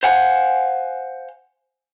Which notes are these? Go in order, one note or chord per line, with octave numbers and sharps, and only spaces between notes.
C5 F5 F#5 G#5